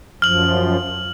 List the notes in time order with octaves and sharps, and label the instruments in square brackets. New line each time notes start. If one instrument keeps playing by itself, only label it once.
[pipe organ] F#2 F3 [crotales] F6 F#7